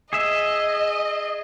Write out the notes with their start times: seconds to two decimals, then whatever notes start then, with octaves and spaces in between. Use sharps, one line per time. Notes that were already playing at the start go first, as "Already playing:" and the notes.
0.13 G#4 D#5 E5